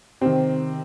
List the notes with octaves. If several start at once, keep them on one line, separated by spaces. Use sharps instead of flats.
C3 D#3 C4